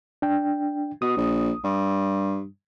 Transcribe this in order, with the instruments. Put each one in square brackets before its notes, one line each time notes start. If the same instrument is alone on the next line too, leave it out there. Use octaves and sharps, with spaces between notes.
[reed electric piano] D4 G5
[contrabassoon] B2 [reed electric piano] D#6
[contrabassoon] A#1
G2